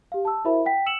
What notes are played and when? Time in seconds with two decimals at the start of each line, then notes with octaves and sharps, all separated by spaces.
0.12 G4 F5
0.25 A5 E6
0.45 E4 F#4 A#4 C5 E5 B5
0.65 F#5 G5 B6
0.86 E6 C#7 E7 F#7